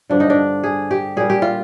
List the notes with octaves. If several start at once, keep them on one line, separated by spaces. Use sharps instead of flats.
G2 D3 F3 D4
D#4
D4
G#4
G4
A#2 G3 G#4
G4
F4